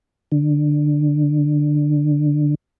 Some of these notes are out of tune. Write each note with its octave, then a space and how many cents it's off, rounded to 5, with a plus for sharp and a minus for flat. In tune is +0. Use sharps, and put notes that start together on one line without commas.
D3 +15